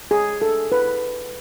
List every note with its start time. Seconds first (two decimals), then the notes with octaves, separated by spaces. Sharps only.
0.11 G#4
0.42 A4
0.72 B4